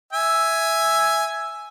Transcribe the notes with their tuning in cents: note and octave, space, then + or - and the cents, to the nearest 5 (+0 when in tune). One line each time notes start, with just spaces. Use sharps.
E5 +0 G#5 +0